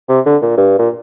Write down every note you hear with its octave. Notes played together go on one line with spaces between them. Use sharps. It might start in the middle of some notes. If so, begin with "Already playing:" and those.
C3
D3
A#2
G2
A#2